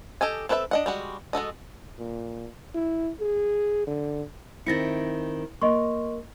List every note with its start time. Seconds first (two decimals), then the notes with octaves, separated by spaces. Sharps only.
0.21 G4 A4 D#5 G#5
0.49 C4 A4 B4 C#5 E5
0.71 D4 D#5 F#5
0.86 G3 G#3 F#4
1.33 G#3 F#4 A4 D#5
1.99 A#2
2.75 E4
3.20 G#4
3.87 D3
4.66 D#3 C4 E4 A6 A#6 C#7
5.61 A#3 D#5 C6 C#6